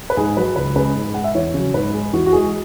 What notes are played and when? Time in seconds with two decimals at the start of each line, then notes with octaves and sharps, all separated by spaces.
0.10 B4
0.17 G#2 G#4
0.37 F#3 B4
0.56 C#2 B4
0.76 C#3 G#3 B4
0.95 G#2
1.14 G#3 F#5
1.24 E5
1.35 E2 C#5
1.54 C#3 F#3
1.74 G#2 B4
1.94 G#3
2.13 E2 F#4
2.26 F#4
2.32 E3 G#3 G#4